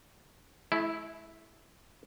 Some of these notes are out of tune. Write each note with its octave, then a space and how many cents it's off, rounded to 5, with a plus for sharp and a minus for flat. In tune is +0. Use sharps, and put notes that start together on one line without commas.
A3 -45 E4 -5